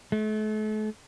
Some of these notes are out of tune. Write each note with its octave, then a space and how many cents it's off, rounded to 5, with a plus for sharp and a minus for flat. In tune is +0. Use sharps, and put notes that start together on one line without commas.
A3 -40